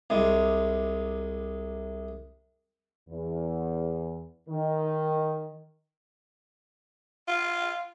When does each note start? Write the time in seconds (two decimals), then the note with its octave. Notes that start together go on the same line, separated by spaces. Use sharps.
0.10 C2 C3 G#3
3.10 E2
4.49 D#3
7.28 F4